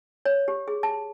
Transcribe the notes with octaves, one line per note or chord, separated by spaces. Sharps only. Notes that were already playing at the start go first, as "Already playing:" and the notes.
C#5
G4
G#4
A5